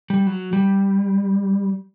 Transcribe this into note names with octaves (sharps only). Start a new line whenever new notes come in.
G3
F#3
G3